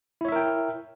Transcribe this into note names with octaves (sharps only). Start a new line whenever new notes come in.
E4 A#4 C#5 E5 G5